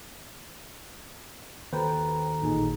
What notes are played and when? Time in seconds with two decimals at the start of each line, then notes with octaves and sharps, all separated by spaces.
1.73 D#2 F#4 A4 B4 C5 G5 A#5
2.42 A1 A#2 D#4 G#4